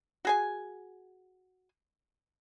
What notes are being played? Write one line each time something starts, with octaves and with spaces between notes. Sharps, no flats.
F#4 G#4 G#5